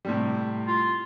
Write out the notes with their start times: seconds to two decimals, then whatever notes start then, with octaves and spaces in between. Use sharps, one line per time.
0.05 A2 C3 G3
0.67 F4